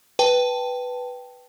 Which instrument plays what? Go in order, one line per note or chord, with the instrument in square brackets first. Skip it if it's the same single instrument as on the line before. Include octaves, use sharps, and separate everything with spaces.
[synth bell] B4 G5 A5